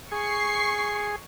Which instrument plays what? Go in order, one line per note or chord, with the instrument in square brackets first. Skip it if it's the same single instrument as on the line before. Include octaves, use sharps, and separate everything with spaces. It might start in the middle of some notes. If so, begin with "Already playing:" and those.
[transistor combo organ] G#4 [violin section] C#6 C7